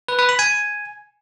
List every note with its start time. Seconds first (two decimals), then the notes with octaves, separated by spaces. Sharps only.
0.08 B4
0.19 B4
0.29 B5
0.39 G#5